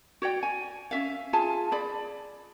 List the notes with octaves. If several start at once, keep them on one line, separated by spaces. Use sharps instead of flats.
F#4 C#5 D5 G5
G#5
C#4 E5 F5
F4 G#4 G#5 A5
G#4 D5 B5